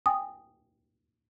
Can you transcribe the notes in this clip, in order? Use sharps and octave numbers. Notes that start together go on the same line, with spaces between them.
G5 G#5 D#6